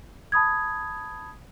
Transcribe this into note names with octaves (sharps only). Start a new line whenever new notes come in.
A5 B5 D#6 G#6